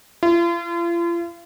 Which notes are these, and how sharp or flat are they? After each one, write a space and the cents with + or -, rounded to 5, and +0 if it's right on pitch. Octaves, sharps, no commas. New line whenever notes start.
F4 -40